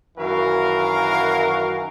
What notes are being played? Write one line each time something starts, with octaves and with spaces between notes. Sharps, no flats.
F#2 D#3 E3 F#4 A#4 F5